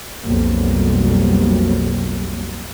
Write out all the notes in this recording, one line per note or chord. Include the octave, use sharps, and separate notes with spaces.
B1 F2 F#3 G3 A#3